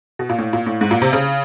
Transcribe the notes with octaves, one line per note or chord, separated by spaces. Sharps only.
B2
A#2
A2
A#2
A2
G#2
A#2
C3
C#3